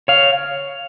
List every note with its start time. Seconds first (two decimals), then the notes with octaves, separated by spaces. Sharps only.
0.08 C#5 F5